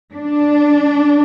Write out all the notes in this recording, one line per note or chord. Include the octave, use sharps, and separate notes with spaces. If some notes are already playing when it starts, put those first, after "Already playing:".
D4